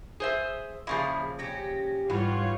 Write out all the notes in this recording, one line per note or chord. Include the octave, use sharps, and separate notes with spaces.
G#4 C5 E5
A#2 C#3 F3 E4 G#4 B5
C#4 G4 A#6
G#2 E3 G3 F4 F#4 C#5